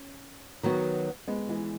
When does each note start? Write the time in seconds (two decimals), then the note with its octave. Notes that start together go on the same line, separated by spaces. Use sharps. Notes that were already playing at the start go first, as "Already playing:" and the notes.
Already playing: C#4
0.63 D#3 F#3 B3 F#4
1.28 G#3 B3
1.49 E3 G#3